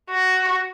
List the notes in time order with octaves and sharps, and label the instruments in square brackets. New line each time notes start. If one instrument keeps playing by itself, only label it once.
[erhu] F#4